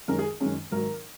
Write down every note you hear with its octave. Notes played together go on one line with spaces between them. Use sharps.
F#2 D#3 G#3 C#4 A#4
G#4
F#2 D#3 G#3 C#4
G#1 G#2 F#3 A#4